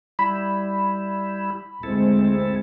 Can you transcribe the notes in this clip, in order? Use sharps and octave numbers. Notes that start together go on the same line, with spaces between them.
G3 E4 B5
D2 G#3 C4 E4 A4